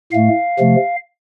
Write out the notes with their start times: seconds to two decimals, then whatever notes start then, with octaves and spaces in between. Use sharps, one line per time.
0.12 A2 A3 F5
0.59 C3 F3 A3